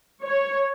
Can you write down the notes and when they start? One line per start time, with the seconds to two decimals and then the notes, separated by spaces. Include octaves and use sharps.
0.24 C#5